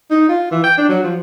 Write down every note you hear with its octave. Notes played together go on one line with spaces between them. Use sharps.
D#4
F4
E3
G5
D4
F#3
F3